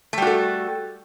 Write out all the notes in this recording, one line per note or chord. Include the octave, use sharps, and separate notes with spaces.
G3 A3 F#4 A4